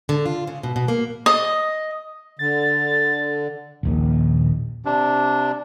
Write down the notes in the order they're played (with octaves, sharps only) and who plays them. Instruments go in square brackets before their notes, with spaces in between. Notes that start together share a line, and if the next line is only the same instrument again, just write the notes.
[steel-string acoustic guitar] D3
F4
C#3
B2
B2
A#3
[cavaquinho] D#5
[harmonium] D3 [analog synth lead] A6
[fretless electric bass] D#1 A#1 D#2
[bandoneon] C3 D4